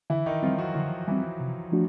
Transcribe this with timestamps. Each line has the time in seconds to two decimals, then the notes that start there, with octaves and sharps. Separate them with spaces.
0.10 D3 E3 E4
0.26 D#3 D#4
0.43 F3 G3 C4 F4
0.59 F#3 F#4
0.75 D3 F3 F4
1.07 E3 G3 C4 E4
1.40 C3
1.72 F3 A3 D4 F#4